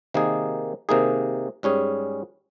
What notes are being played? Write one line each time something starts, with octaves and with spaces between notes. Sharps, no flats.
C3 D#3 A#3 D#4 G#4
C3 D#3 A#3 D#4 G#4
G#2 G3 C#4 G#4